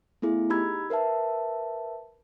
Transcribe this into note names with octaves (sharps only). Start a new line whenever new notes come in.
A3 B3 E4 G#4
D#4 G4 A#5 B5 E6 G#6
A#4 B4 E5 A5